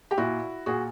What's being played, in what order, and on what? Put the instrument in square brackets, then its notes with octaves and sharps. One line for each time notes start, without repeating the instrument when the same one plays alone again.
[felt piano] G4
A#2 E4 F#4
A#2 F#4 G#4